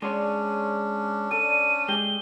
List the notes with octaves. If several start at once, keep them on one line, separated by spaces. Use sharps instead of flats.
G#3 C#4 D4 G#4 C#5 D5 C6 E6
A4 D5 D#7
G#3 G4 G#4 G7